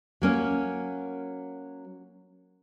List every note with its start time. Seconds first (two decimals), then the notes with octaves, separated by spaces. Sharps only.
0.22 F#3 A#3 C#4